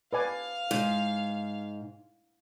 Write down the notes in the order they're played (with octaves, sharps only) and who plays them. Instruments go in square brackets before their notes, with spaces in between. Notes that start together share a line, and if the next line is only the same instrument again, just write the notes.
[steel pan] B4 D5 G#5 [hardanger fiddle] F5
[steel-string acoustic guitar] G#2